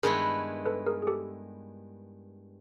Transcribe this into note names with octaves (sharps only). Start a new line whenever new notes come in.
G2 D#3 G#3 B3 E4 G#4 A#4
A4 B4
G#4 A#4
G#4
G4 A4